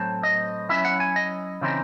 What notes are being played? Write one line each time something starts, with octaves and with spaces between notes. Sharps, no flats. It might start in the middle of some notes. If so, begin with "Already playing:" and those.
Already playing: A2 F#3 C4 A5
D#5
F#3 C#4 E4 E5
F#5
G#5
D#5
C#3 E3 C4 D#4